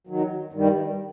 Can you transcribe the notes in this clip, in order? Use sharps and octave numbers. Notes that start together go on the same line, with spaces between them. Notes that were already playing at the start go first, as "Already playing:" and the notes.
D#2 D#3 F#3
G2 D#3 G3